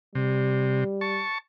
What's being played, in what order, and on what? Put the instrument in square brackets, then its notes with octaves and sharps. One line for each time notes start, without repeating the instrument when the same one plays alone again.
[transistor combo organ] C3 [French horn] G3
[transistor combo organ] A5 C#6